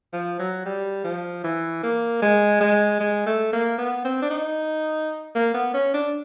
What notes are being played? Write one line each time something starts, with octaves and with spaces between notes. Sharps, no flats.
F3
F#3
G3
F3
E3
A#3
G#3
G#3
G#3
A3
A#3
B3
C4
D4
D#4
A#3
B3
C#4
D4